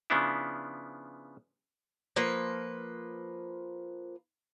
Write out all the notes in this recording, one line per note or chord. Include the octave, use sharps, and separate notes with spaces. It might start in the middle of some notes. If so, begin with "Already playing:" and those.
C#3 F3 B3 D4 E4
F3 A#3 B4